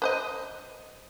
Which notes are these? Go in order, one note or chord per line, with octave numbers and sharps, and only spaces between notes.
B4 C5 D#5